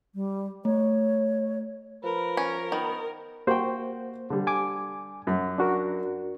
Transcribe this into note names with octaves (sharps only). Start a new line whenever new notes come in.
G3
A3 C#5
F3 A#4 B4
C#4
D#3 B3
A#3 F#4 C5 G5
D3 G3
G#5 D6
F#2
D4 F#4 A#4